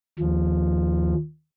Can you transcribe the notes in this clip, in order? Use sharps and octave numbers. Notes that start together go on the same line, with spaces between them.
D#2 F3